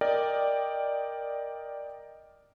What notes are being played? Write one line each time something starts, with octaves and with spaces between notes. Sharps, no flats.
A#4 D5 D#5 G5